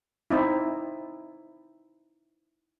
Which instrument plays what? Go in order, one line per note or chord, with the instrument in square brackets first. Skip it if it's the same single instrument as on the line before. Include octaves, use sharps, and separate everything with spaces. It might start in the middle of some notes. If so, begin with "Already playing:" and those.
[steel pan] C4 D#4 E4